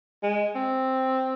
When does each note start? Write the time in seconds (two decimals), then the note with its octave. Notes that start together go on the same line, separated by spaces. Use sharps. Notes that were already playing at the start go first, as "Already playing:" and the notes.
0.23 G#3
0.55 C4